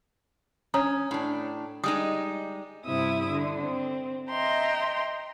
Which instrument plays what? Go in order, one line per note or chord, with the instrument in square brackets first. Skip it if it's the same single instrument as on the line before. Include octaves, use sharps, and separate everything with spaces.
[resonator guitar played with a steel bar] C#4 [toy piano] C#5 A#5 D#6
[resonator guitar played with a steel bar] A2 D4
[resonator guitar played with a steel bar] G3 G#3 D#4 [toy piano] D#6
[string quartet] G2 C3 E4 E5 D#6
D3
C4
D#5 E5 G5 A#5 C6